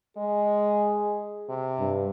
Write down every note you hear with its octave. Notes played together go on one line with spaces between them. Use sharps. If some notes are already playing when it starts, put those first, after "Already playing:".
G#3 G#4
C3
G2